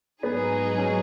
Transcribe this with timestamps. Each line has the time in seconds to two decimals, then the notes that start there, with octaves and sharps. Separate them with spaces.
0.23 G#2 F#3 B3 D#4 G#4
0.78 C#4